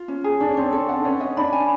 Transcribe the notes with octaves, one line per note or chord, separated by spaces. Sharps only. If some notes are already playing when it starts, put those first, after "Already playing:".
Already playing: F4
C#4
G#4
D4 A4
C#4
C4 C#5
C#4
A4
F#5
D4
C#4 B4
D#5
D4 B5
G#5